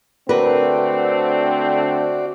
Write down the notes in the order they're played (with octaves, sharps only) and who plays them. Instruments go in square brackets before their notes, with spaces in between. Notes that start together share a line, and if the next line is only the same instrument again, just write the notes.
[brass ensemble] D3 A3 C4 [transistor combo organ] F#4 D5 [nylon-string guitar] A#4 B4